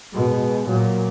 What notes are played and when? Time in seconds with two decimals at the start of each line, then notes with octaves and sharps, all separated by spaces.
0.14 B2 G#3
0.68 A#2 F#3